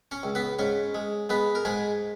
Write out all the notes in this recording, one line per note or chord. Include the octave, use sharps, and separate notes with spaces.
C#4 C#5
C#2
B3 B4
G#2 C#4 C#5
G#3
G#3 B3 B4
A#4
G#2 G#3 G#4